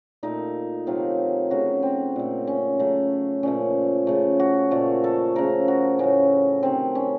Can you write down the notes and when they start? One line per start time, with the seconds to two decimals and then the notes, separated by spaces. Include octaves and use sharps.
0.23 A#2 A3 D#4
0.87 C3 D#3 F#3 A3 F4
1.51 C#3 F#3 A3 F#4
1.83 C4
2.16 A#2 A3
2.47 C#4
2.79 C#3 F#3 A3
3.43 A#2 F3 A3 C#4
4.07 C#3 A3
4.40 F#4
4.71 A#2 F3 A3
5.04 A4
5.35 C#3 F3 A3 A#4
5.68 F#4
5.99 A2 F#3 A3 C#4
6.63 C3 D#3 F#3 C4
6.95 C#4